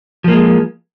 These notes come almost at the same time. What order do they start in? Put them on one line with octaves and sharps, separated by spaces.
F3 A#3 G#3